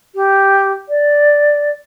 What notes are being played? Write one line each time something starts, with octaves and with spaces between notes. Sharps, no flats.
G4
D5